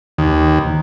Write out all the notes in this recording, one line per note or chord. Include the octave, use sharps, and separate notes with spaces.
D#2